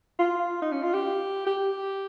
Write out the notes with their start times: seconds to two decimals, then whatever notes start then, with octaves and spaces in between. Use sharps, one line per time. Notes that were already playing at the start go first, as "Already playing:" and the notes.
0.19 F4
0.62 D#4
0.72 C#4
0.83 F4
0.94 G4
1.47 G4